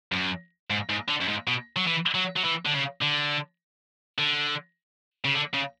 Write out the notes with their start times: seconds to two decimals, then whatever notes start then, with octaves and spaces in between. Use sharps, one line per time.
0.12 F#2
0.70 G#2
0.89 G#2
1.08 D3
1.21 F#2
1.28 G#2
1.47 B2
1.76 F#3
1.87 E3
2.15 F#3
2.37 F#3
2.44 E3
2.66 D3
2.74 C#3
3.02 D3
4.18 D3
5.25 C#3
5.35 D3
5.54 C#3